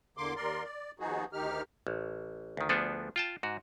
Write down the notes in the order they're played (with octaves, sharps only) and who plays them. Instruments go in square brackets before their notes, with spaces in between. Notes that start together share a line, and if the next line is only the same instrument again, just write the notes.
[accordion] E2 D3 A#3 C6 D6
D#2 A#4 D5 C6
D5
D#2 F3 B3 D#4 F#4 G#4
D2 D#3 D#4 G4 F6
[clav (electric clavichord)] A1
D2 D#3
D2 F3 B3 D4 G#4 A4
F4 G5 A5
G#2 F#4